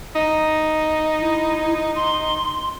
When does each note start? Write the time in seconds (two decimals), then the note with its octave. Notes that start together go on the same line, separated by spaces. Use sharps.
0.16 D#4
1.20 E4
1.96 C6